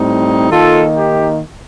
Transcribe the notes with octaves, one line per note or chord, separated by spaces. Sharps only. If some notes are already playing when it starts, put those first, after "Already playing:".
Already playing: A2 G3 C4 D#4
D#3 A#3 D#4 F4 A4
G4